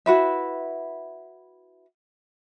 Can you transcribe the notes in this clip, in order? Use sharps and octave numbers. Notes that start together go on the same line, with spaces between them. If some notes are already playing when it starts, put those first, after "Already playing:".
E4 F#4 B4 E5